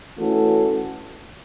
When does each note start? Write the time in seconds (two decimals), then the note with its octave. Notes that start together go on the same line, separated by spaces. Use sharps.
0.16 E3 A3 C#4 F#4 A4